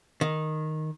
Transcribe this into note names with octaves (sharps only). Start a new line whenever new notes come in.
D#3